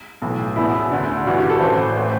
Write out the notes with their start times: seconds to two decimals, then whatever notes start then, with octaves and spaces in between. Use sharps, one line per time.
0.22 B1 A2 E3
0.56 E1 E2 B2 E4
0.91 D2 D3
1.27 A1 G2 E3 F#4
1.38 G4
1.50 A4
1.61 A1 A2 E3 C5
1.78 B4
1.96 A2 E3 C5